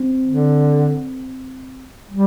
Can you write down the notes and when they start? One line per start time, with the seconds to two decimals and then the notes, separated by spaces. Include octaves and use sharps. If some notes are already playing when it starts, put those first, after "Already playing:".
Already playing: C4
0.26 D3
2.11 G3